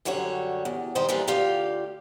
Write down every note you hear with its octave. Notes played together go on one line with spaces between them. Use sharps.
F#2 D3 G3 F#4 C#5
E2
D#3 G3 C5 D#5
E3 F3 G3 A#3 D4
D2 F4 G4 D5 F5 G5